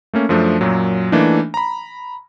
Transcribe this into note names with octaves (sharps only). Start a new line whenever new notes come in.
A3 A#3 C#4
F#2 F3 A3 D4
F#2 A#2 F#3
E3 A3 A#3 D4 D#4
A#5 B5